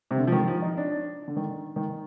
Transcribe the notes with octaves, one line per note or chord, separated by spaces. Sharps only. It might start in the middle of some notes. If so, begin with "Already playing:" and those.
C3
D3
F3
D#3
F3
D#4
D4
D3
D#3
D#3